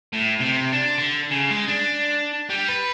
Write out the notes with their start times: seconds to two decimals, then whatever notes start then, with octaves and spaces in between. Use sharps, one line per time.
0.13 A2
0.40 C3
0.72 D4
0.98 D3
1.31 C#3
1.50 G#3
1.68 D4
2.50 G3
2.68 B4